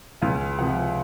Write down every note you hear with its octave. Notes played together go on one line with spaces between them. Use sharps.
C#2 F5
C3 F3 F#5